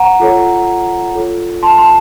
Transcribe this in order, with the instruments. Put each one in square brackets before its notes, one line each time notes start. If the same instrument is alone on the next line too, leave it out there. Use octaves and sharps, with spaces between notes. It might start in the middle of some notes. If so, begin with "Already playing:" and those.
Already playing: [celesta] F#5 A#5
F4 A4 C#5
F4 A4 C#5
A5 C6
A5 C6